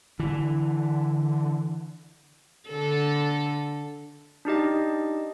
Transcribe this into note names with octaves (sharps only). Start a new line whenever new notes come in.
D3 E3
D3 A4
D4 D#4 G4 D#5